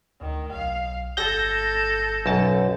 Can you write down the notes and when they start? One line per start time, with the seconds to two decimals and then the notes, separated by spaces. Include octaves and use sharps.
0.21 D2 D#3
0.52 B1 F5
1.17 G1 A4 G6 A#6
2.26 B1 F#2 A5